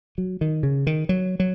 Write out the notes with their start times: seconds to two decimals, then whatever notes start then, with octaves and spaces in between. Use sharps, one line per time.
0.18 F#3
0.41 D#3
0.63 C#3
0.87 D#3
1.09 F#3
1.40 F#3